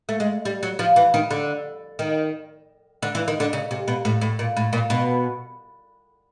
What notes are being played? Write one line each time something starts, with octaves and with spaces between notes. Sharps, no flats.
A3
G#3
G3
F#3
F3
E3
D#3
D3
D#3
D3
E3
D#3
D3
C#3
C3
B2
A2
A2
A#2
A2
A#2
B2